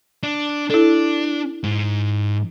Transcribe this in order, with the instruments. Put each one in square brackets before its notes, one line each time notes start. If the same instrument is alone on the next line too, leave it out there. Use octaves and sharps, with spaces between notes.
[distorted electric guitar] D4
[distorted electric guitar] D4 [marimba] E4 A4
[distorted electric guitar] G#2